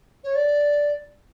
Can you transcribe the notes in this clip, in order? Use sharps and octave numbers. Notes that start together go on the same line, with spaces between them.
C#5
D5